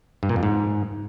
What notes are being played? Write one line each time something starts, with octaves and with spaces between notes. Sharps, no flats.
G2
A#2
F2
G#2